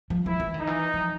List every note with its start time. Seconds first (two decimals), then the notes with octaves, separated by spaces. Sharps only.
0.10 F3
0.26 F3 E4
0.40 E3
0.54 D#3
0.60 D#4
0.67 E3
0.94 F3